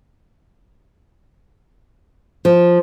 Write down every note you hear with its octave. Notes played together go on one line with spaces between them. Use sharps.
F3